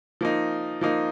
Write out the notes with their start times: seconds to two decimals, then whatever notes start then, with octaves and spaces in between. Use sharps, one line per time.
0.21 F3 A#3 D#4
0.81 F3 A#3 D#4